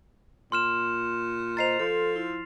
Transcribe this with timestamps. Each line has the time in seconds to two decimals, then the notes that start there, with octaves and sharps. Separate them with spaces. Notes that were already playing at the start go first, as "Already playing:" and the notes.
0.52 A#2 C6 F6 E7
1.57 C5 D#5 A#5 A6 C7 F7
1.79 F3 A4
2.16 E4